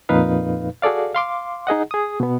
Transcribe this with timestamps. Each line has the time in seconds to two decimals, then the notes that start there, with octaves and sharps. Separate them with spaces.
0.09 F2 A#2 D#4 B4 F5
0.82 F#4 G#4 A4 D5 F5
1.15 F5 C6 D6
1.67 D#4 G#4 D#5 F#5
1.91 G#4 D#6
2.20 B2 B3